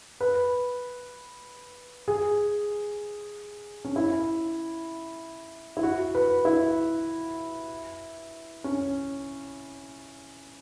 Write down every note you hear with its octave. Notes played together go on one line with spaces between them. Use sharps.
B4
G#4
C#4
E4
E4
F#4
B4
E4
C#4